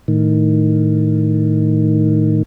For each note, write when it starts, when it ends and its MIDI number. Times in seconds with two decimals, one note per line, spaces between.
0.08 2.43 45
0.08 2.43 51